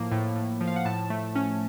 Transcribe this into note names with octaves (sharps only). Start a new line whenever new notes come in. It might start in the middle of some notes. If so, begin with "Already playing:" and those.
Already playing: A2 F3 A#3
A2
A2
F3
F5
F#5
A2 A5
A3
C#4